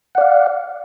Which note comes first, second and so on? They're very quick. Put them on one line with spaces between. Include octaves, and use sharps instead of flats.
F#5 D5 F5